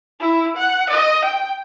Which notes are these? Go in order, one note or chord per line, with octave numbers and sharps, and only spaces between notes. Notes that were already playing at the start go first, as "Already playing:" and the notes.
E4
F#5
D#5
G5